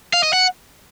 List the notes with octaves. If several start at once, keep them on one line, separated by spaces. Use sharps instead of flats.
F5
D#5
F#5